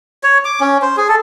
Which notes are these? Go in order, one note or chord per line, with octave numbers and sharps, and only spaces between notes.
C#5
D6
C#4
C5
G#4
A4